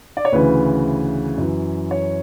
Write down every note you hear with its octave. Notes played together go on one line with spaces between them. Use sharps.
D5
C#5
D2 C#3 E3 B4
F#2 E3
C#5